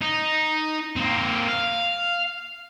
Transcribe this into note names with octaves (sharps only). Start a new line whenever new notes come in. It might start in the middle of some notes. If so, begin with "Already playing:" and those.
D#4
A#3 C4
F5